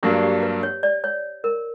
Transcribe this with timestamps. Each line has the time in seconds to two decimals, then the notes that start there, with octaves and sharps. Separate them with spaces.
0.03 G2 F#3 A#3 D4 G4
0.23 G4
0.43 B4
0.63 C#5
0.83 D5
1.04 C#5
1.44 A#4